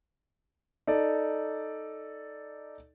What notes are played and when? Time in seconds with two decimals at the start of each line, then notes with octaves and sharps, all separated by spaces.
0.87 D#4 A4 D5